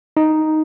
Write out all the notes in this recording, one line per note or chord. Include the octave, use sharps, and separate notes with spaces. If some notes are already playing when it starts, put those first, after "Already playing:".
D#4